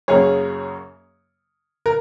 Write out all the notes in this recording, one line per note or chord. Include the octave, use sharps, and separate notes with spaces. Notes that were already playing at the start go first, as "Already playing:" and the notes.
F#2 C#3 A#3 C#4 G#4 C#5
A#4